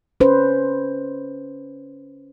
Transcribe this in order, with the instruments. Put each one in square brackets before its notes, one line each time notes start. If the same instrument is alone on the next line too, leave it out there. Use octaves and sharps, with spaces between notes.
[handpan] C#4 B4 C5